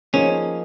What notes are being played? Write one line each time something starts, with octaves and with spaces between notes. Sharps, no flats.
F3 A#3 C#4 D#4 G#4